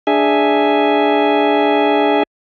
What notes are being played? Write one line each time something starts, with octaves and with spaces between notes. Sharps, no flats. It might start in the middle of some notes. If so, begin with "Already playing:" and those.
D4 G#4 E5 G#5